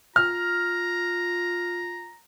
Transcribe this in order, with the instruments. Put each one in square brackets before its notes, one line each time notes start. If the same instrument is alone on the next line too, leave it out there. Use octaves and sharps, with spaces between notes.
[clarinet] F4 [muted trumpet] A#5 [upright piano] F6